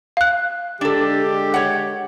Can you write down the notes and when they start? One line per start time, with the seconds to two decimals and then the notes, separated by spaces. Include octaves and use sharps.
0.17 F5 F#6
0.81 D3 G#3 D4 G4 A4
1.54 C#5 F#5